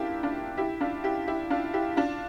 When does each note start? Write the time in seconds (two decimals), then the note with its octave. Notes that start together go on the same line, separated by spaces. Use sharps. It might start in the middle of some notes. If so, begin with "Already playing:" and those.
Already playing: A#3 D4 E4 F4 G4
0.23 D4 F4
0.57 E4 G4
0.81 D4 F4
1.04 E4 G4
1.27 E4 G4
1.50 D4 F4
1.73 E4 G4
1.97 D4 F4